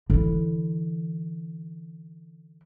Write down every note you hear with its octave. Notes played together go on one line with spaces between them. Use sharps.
D3 E3